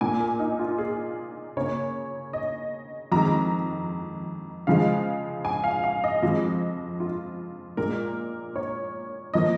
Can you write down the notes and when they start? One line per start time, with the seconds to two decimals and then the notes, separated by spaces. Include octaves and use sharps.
0.01 A#2 A#3 G#5
0.20 A#4
0.39 D#4
0.59 F4
0.78 G#4
1.57 C#3 A#3 C#5
2.33 D#5
3.12 F2 D#3 G#3 A#5
4.67 C#3 F3 G#3 F5
5.45 G#5
5.64 F5
5.84 F5
6.04 D#5
6.23 F2 F3 G#3
7.00 F4
7.77 A#2 G#3 A#4
8.56 C#5
9.34 F3 A#3 D#5